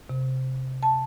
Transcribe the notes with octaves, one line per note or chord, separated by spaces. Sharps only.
C3
A5